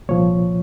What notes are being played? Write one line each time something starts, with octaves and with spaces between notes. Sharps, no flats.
C2 A#2 F3 C#5